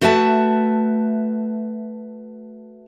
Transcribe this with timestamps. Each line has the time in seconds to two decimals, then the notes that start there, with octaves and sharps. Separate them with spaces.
0.01 A3 F#4 B4 E5 G#5 A5